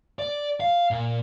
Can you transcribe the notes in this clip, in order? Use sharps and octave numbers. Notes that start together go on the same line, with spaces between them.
D5
F5
A#2